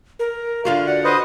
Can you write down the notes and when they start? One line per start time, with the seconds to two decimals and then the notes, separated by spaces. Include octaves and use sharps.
0.19 A#4
0.65 D3 F4 F#4 F5
0.87 D5 F#5
1.04 B4 C5 D#5 D#6